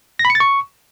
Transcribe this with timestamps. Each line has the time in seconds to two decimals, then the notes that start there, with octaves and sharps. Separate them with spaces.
0.19 A#6
0.25 B5
0.30 C#7
0.35 A6
0.40 C#6